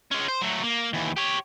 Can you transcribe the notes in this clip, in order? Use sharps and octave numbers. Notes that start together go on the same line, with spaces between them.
G#3 C#4
C5
F#3 A3
A#3
D#2 E3
G4 C#5